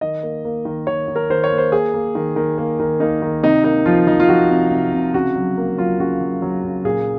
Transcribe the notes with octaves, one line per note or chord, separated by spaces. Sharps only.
D#3 D#5
A#3
A#3
D#3
D#3 C#5
D#3
A#4
D#3 C5
C#5
A#3
C5
A#3 G#4
A#3
D#3
D#3
A#3
D#3
A#3 D#4
D#3
C3 D#4
A#3 D#4
F3 F4
F3 D#4
F4
F3 F#4
C3
C3
C3
C#3 F#4
F#3
A#3
F#3 F4
C#3 F#4
F#3
F#3
C#3
A#2 G#4